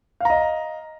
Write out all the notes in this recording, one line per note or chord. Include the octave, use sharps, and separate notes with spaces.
D#5 F5 A#5